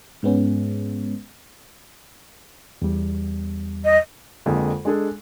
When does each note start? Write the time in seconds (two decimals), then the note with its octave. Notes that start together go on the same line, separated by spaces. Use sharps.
0.23 G#2 G#3 B3 C#4
2.82 E2 G3
3.85 D#5
4.46 F2 D3 G#3 A#3
4.85 G#3 D4 G#4 A4